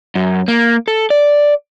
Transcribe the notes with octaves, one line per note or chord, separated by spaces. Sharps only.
F#2
A#3
A4
D5